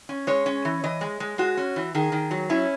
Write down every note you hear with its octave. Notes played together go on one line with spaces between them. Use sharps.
C#4
G#3 C#5
C#4
E3
E3 D#5
G#3
G#3
G#3 F#4
C#4
E3
D#3 G#4
D#3
F#3
C#4 E4